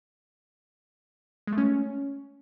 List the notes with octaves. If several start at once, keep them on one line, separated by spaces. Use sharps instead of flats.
G#3
A3
C#4